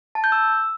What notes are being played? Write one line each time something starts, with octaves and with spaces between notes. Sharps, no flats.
A5
G6
E6